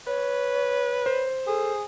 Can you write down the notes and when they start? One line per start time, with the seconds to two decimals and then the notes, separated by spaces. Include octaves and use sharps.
0.07 B4 C#5
1.06 C5
1.47 G#4 A4